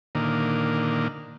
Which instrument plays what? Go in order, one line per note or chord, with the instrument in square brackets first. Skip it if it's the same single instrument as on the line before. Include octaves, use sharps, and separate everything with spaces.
[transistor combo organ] A#2 D3 D#3 A#3